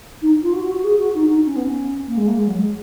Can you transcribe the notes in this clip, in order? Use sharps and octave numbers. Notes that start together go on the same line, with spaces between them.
D#4
F4
F#4
F#4
F#4
G#4
F#4
D#4
D#4
C#4
B3
C#4
A#3
G#3
A#3
G#3
F#3
G#3